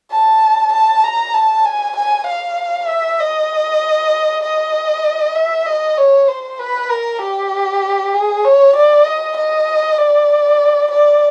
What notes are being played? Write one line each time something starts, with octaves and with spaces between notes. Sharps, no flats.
A5
A5
A#5
A5
G#5
G#5
F5
E5
D#5
D#5
E5
D#5
C#5
C5
B4
A#4
G4
G#4
C#5
D5
D#5
D#5
D5
D5